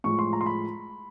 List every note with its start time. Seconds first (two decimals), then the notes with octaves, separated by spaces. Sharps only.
0.04 A2 F3 G#3 C#6
0.19 C6
0.33 A#5
0.41 C6
0.46 B5